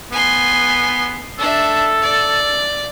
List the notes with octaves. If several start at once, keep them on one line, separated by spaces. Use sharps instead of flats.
B3 G#5 C6
D4 A4 E5
D5